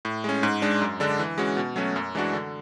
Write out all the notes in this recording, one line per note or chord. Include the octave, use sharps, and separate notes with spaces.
A2
G#3 C#4
G#2
G#3 D4
F#2
D3 G#3 D4
E3
G#3 C#4 F#4
B2
F#3 A3 C#4 F#4
F#2
E3 G#3 D4 F#4
D3